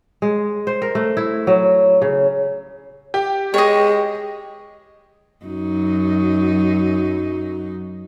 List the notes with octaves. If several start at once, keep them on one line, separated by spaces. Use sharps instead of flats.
G#3
C5
A#4
A3
E4
F#3
C#3
G4
G#3 C#5 D#5
F#2 F#3 D#4